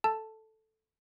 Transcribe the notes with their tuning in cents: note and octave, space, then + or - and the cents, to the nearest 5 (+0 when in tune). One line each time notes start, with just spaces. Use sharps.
A4 +0 A5 +0